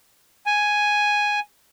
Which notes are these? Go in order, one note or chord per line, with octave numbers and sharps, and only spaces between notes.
G#5